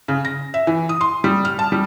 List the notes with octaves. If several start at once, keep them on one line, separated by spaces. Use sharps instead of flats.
C#3
A#6
E5
E3
D#6
C6
G3
F6
A5
G3